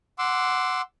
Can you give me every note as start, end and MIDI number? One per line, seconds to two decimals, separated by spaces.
0.19 0.82 78
0.19 0.82 84
0.19 0.82 86
0.19 0.82 88